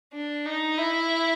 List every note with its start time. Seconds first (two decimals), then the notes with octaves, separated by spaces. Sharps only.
0.13 D4
0.46 D#4
0.78 E4